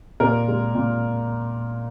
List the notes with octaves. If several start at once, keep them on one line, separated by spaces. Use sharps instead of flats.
A#2 A#4
G#3
A#2